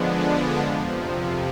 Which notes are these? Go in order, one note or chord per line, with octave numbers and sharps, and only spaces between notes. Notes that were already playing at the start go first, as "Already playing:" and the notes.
Already playing: D3 F3 G#3 B3 D4
F2 C3 F3